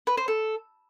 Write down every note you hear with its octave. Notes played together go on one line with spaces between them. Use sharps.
B4
C5
A4